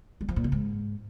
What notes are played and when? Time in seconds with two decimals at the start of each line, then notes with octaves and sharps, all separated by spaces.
0.21 G3
0.29 F3
0.36 A#2
0.44 C#3
0.52 G#2